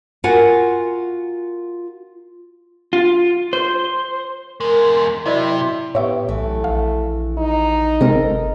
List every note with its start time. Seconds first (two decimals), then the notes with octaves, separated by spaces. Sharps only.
0.24 F4 F#4 A#4 F#5 G#5
2.93 F4
3.53 C5
4.61 E2 G#3 A#4
5.26 C3 F#3 E4 D5 D#5
5.95 A2 B3 G4 C#5 E5 C#6
6.29 B1 E3 A3
6.64 A#1 F5
7.38 D#4
8.01 G1 C3 G#3 C4 A4 A#4 D#5